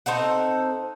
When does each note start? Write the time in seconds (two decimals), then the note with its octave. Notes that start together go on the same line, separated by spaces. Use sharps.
0.06 C4 D#4 A4 F#5